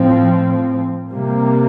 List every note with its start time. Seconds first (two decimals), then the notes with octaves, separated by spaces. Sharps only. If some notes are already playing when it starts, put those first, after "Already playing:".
Already playing: A2 F3 C4
1.10 C3 G3 A#3